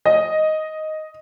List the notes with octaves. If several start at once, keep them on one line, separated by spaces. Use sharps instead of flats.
D#5